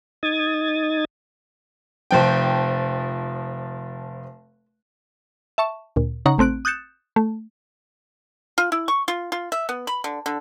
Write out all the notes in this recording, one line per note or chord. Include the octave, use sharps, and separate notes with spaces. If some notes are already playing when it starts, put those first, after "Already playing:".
D#4 D#6 G#6 A6
F1 F3 G5
E5 A5 C#6 E7
D2 A#2
C#3 D#4 F#5 A#5 C#6
A1 A3 C4 F#6 D7
D#6 F#6 G6 A6 C#7 E7
A3
F4
E4
C#6
F4
F4
E5
B3
B5
D3
D3